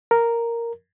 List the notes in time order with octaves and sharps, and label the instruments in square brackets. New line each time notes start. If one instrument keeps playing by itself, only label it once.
[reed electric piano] A#4